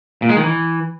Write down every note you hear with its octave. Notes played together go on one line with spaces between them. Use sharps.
A#2
G#3
D#3
E3